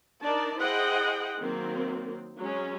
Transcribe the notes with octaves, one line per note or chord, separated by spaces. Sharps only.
D4 D#4 A#4 D5 A5
E4 G#4 C5 D#5 F#5 G5
D#3 F#3 A#3 C4
F#3 G#3 C#4